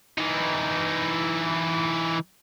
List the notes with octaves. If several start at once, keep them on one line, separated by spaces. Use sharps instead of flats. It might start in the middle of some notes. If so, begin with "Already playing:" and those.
E3 D#4